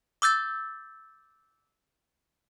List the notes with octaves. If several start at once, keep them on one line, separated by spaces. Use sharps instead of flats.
D6 E6 G6 A6